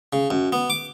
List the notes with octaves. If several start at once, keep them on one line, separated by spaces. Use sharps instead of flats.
C#3
F#2
B3
D6